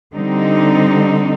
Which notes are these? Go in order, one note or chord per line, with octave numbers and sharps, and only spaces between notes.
D3 G3 C4 D#4